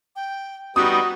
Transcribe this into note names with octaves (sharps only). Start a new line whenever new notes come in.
G5
G3 B3 D#4 F#4 D#6